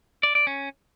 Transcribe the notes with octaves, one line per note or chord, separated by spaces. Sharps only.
D5
D5
C#4